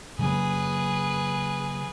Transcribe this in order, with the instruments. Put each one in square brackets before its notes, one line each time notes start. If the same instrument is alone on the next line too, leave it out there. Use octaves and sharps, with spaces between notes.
[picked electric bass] C#3 F#3 A#3 [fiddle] G#4 B4